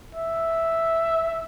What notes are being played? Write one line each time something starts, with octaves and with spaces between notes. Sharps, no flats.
E5